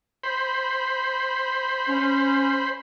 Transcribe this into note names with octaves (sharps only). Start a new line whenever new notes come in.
C5 B5
C#4